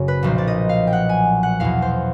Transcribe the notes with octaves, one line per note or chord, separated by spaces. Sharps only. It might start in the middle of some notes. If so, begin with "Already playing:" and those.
Already playing: F#1 F#2 C#3 C#5
B4
B1 A#2 F3 C5
D5
D#5
F5
G5
F#5
G#5
F#5
E2 B2 F5
C5